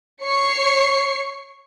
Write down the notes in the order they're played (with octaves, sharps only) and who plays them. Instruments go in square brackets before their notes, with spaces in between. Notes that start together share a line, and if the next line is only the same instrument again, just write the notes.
[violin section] C#5 C#6 C7 C#7